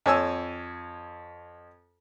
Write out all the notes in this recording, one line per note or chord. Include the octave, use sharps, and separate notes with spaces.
F2 C#5 G#5 E6